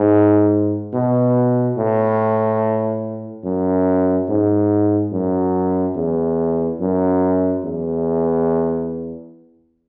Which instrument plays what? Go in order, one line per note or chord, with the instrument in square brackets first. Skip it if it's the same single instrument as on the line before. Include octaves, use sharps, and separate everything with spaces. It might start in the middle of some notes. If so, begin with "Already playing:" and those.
Already playing: [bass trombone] G#2
B2
A2
F#2
G#2
F#2
E2
F#2
E2